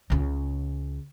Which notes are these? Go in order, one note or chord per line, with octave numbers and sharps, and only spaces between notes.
C#2 C#3